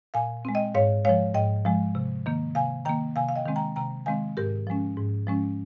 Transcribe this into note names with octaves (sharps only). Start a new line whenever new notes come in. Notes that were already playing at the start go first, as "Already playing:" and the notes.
A#2 F5 G#5
G#3 C4
D#5 G5
G#2 C#5 F5
F3 G#3 C#5 F5
G#2 D#5 G5
F3 G#3
C3
D#3 A#3
C3 F5 G#5
D#3 A#3 G5 A#5
C3 F5 G#5
F5
D#5 G5
D#3 G#3 C4
G5 A#5
C3 G5 A#5
D#3 G#3 C4 F5 G#5
G#2 G4 A#4
F3 G#3 C#4
G#2
F3 G#3 C#4